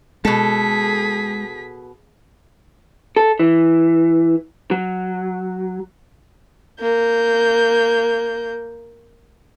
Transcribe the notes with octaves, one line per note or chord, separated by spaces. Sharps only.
B2 G#3 G#4 A4 B6
A4
E3
F#3
A#3 G6